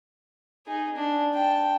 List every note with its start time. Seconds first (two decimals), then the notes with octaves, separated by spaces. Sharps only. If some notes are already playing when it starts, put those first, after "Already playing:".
0.67 D#4 G#4
0.96 D4
1.34 G5 A5